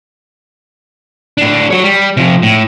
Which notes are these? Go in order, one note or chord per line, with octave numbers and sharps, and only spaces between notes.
A2 D4
F#3 C#5
G3
C3 F3
A2